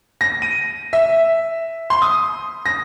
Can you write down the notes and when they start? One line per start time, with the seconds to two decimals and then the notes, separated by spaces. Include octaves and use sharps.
0.21 A#6
0.42 D#7
0.93 E5
1.90 C6
2.02 D#6
2.66 A#6